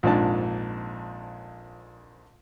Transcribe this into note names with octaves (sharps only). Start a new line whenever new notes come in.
A#1 F2 G#2 D4 A5